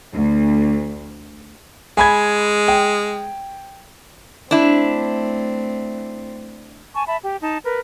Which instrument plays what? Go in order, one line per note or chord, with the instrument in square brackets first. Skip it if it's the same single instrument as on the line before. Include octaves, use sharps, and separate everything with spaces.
[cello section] D2
[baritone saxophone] G#3 [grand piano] G#5 B5 G#6
[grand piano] G5
[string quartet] A3 C4 [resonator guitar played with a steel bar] D4 E4
[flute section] G#5 A5 C#6
E5 A5 B5
G4
D#4 A5
A#4 B4